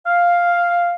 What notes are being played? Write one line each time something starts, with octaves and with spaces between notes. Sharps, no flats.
F5